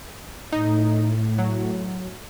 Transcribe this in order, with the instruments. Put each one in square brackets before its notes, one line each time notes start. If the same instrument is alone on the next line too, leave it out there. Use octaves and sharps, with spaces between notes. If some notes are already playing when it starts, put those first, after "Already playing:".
[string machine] A2 [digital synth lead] D#4
[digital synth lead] F#3